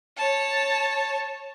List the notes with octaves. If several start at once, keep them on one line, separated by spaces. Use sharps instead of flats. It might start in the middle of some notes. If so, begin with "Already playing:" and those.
C#5 A5